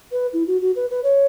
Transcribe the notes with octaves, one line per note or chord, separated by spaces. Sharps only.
B4
E4
F#4
F#4
B4
B4
C#5